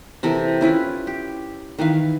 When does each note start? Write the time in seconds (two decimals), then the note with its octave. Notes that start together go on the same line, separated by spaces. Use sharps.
0.23 C3 E3 A4 A#4
0.61 C#4 E4 F4 B4
1.07 G4
1.79 D#3 E3 B4 F5